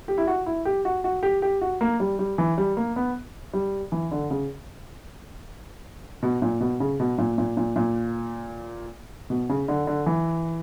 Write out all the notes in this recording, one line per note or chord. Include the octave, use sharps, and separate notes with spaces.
G4
E4
F#4
E4
G4
F#4
F#4
G4
G4
F#4
A#3
G3
G3
E3
G3
A#3
B3
G3
E3
D3
C#3
B2
A#2
B2
C#3
B2
A#2
A#2
A#2
A#2
B2
C#3
D3
D3
E3